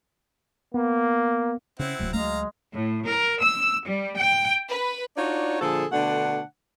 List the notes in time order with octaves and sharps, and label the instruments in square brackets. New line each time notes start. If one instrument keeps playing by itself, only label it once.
[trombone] A#3 [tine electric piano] B3
[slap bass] C#3 C#4 [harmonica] C4 E4 F#5
[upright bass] D1 A#2 [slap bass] F#3
[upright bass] D2 [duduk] G#3 [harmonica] F5 A#5
[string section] A2
A#4
E6
G3
G5
B4
[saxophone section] D4 D#4 F4 F#4 C#5 D5
A#2 D3 F3 G#4 A4
B2 D3 A3 D4 F#5